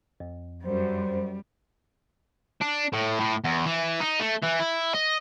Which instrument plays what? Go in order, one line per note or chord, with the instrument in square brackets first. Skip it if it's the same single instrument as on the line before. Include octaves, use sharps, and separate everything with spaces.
[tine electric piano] F2
[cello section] F#2 [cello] G3 [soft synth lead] C5
[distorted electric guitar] D4
A2
A2
E2
E3
D#4
A3
E3
E4
D#5